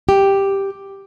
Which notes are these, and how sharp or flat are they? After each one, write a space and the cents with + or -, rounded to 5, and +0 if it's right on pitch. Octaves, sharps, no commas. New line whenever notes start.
G4 +0